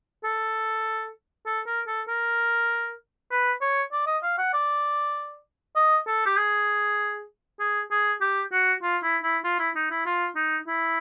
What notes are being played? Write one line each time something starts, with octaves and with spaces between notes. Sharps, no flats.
A4
A4
A#4
A4
A#4
B4
C#5
D5
D#5
F5
F#5
D5
D#5
A4
G4
G#4
G#4
G#4
G4
F#4
F4
E4
E4
F4
E4
D#4
E4
F4
D#4
E4